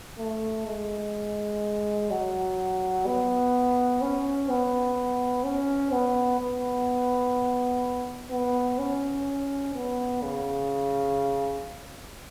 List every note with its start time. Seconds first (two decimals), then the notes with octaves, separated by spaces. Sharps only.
0.18 A3
0.67 G#3
2.10 F#3
3.06 B3
4.01 C#4
4.50 B3
5.45 C#4
5.92 B3
6.40 B3
8.31 B3
8.78 C#4
9.75 B3
10.23 C#3